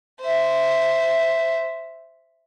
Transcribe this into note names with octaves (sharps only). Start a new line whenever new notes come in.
C5 E5